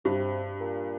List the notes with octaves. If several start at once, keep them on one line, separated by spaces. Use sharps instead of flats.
G2 C3
A#2